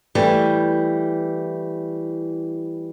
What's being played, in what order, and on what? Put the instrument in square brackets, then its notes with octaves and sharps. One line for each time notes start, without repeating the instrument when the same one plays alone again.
[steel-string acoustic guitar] E3 G3 A3